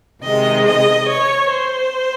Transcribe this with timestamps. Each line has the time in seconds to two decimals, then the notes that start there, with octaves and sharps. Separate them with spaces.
0.21 C3 D#3 G#3 D#5
0.65 D#5
1.08 C#5
1.49 C5